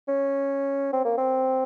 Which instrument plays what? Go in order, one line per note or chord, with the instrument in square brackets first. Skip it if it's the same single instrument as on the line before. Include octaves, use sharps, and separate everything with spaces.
[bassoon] C#4
C4
A#3
C4